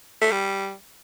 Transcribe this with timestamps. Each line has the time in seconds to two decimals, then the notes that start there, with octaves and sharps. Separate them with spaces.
0.21 A3
0.31 G3